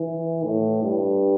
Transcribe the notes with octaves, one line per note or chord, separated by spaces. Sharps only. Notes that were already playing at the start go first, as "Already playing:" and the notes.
Already playing: E3
A2
G2